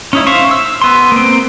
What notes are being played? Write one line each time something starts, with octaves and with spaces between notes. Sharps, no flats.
C#4 D#4 E4
C5 E5 F5 C#6
E6
B3 C6
A#3 C4